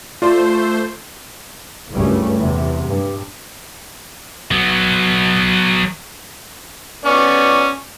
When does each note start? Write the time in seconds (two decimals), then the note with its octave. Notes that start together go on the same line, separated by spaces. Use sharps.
0.22 A3 F4 C5 D5
1.91 F#1 C#2 G2 G3 A3 C#4
2.38 E2 C3
2.87 G2
4.51 F#3 B3
7.05 B3 C#4 D5